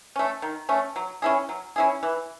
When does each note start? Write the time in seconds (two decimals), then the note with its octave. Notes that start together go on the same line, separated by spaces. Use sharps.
0.16 A3 C#4
0.42 D#3
0.69 A3 C#4
0.96 F#3
1.22 C#4 E4 G#4
1.49 F#3
1.76 C#4 E4 G#4
2.03 E3